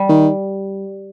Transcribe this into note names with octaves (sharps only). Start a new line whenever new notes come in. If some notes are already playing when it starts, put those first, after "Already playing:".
Already playing: G3
D#3